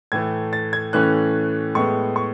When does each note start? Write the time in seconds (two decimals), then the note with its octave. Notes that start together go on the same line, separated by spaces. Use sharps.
0.12 A2 E3 A3 G#6
0.53 A6
0.73 G#6
0.93 A2 E3 A3 C#4 F#6
1.75 A2 G#3 B3 C#6
2.16 C#6